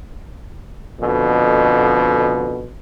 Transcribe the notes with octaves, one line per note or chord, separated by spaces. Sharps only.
F2 B2 D3